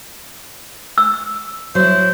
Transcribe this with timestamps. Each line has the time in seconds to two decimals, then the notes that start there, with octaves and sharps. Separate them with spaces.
0.98 E6
1.75 F#3 E4 C5